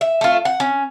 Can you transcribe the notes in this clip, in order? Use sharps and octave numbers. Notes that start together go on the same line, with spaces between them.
E5
A3 F4
F#5
C#4